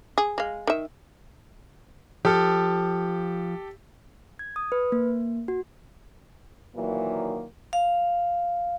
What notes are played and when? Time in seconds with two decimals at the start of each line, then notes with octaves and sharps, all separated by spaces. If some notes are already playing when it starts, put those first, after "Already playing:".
0.18 G#4
0.38 G#3 F5
0.67 D#3 E5
2.25 F3 G4 A4
4.39 G#6
4.56 D#6
4.72 B4
4.92 A#3
5.48 F#4
6.76 A#2 D#3 E3 F#3 A#3
7.73 F5